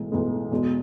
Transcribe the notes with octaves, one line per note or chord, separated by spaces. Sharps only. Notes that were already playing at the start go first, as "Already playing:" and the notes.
Already playing: B1 A2 E3 G#3
B1 A2 E3 G#3
E2 B2 G#3